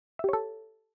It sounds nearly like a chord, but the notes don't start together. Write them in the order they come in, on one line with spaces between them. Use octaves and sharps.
E5 G4 C#5 A4